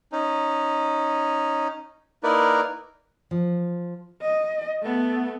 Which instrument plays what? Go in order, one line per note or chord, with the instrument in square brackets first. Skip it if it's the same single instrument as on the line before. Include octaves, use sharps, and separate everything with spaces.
[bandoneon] C#4 D#4
A#3 D#4 E4 A#4 B4 D5
[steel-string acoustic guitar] F3
[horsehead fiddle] D#5
A3 B3